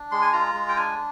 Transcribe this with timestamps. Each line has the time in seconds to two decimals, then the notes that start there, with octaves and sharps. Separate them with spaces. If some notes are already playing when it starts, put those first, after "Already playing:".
Already playing: D4
0.11 G#3 C6
0.22 G#5
0.33 F4 A#5
0.54 G#3
0.69 G5
0.76 D4 G#5